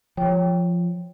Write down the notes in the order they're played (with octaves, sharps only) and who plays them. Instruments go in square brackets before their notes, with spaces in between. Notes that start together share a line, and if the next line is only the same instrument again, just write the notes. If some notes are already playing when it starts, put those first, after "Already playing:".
[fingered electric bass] F3 [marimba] C#5 G5